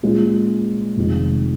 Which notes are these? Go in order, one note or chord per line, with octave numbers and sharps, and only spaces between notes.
A#2 G#3 C#4 F4
F1 F2 D#3 G#3